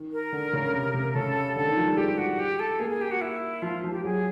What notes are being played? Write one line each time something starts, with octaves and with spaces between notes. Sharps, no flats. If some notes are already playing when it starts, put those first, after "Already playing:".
Already playing: D#3
A#4
D3
C#3
C3
C3
C#3 A4
D3 A4
D#3
F3
G3
G#3 G4
F#4
G4
A4
A#3 G#4
G#4
G4
F#4
E4
F3 F4
F3
G4
F#3 G#4